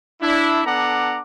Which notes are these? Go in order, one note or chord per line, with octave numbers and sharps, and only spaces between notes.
D4 E4
B3 D4 A4 F#5 A#5 D6